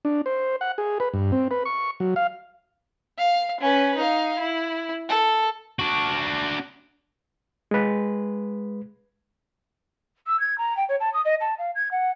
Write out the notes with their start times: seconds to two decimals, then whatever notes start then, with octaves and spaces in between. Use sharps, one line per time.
0.05 D4
0.26 C5
0.61 F#5
0.78 G#4
1.00 B4
1.14 G2
1.32 C4
1.51 B4
1.65 C#6
2.00 F#3
2.16 F5
3.19 F5
3.60 C#4 B4
3.97 D#4 F5
4.39 E4
5.09 A4
5.79 D4 F#4
7.71 G#3 B4
10.27 E6
10.39 G#6
10.58 A#5
10.76 G5
10.88 C#5
11.00 A5
11.13 D#6
11.24 D#5
11.40 A5
11.58 F5
11.75 G#6
11.91 F#5